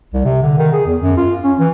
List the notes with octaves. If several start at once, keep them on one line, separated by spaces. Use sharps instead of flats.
C2
C3
D3
D#3
G#4
E2
F#2
F4
C#4
E3